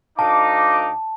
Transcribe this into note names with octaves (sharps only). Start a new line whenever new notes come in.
D2 D#4 F5 A5 D6